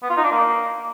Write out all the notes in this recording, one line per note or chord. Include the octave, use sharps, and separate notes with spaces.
B3
F4
D#4
D4
A#3